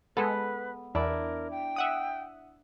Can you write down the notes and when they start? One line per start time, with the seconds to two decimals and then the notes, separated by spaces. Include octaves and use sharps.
0.17 G#3 B3 A4 B4
0.95 E2 D4 E4 A#4
1.51 G5
1.76 E5 F#5 D#6